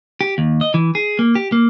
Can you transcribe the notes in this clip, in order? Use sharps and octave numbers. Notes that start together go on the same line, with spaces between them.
G4
D#2
D#5
E3
G#4
A#3
G4
A#3